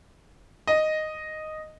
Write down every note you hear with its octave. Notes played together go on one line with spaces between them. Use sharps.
D#5